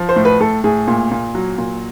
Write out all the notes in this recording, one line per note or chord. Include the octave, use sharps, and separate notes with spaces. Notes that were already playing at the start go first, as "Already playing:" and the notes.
Already playing: F3
C5
A2
B4
A2 A4
A2 G#4
A#2
A#2
F#3
A#2